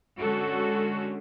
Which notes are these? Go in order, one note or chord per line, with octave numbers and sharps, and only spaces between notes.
D3 G#3 C#4 F#4 A4